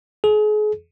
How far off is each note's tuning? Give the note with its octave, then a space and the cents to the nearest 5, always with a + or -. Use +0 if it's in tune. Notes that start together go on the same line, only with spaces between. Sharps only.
G#4 +35